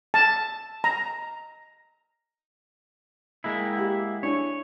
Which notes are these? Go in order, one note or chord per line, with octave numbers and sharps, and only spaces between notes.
A5
A#5
G#3 A#3 E4
G5
G4 F#5 B5
D4 E4 C#5 G#5